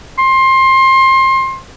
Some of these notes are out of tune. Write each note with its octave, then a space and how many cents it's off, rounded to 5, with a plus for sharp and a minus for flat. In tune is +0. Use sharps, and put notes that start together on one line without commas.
C6 +25